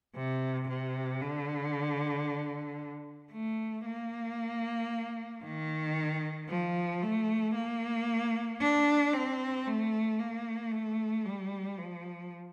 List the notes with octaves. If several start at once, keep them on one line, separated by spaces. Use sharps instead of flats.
C3
C3
D3
A3
A#3
D#3
F3
A3
A#3
D4
C4
A3
A#3
A3
G3
F3